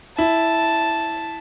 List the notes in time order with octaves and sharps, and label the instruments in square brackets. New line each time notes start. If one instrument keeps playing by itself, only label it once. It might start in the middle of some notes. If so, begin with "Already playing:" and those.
[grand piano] E4 [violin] A5